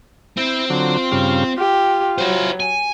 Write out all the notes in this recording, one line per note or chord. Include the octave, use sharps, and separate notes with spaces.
C4 E4
D3 F#3 F4
G2 C#3 F5
F4 G4
F#3 E4 C5
G#5